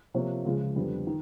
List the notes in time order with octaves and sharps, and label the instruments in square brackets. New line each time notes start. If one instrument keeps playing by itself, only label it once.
[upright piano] C3 F3 A#3 C#5
C#2 C#3 F3 G#3
F2 D3 G3 B3
D#3